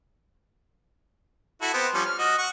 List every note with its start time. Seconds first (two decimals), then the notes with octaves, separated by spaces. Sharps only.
1.62 E4 F#4 A4
1.74 B3 C4
1.94 F3 G3 C#4
2.05 F6
2.19 F#4 D#5
2.38 F#5 C#6